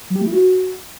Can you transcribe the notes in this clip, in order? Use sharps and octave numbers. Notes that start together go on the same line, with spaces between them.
F#3
G4
A3
E4
F#4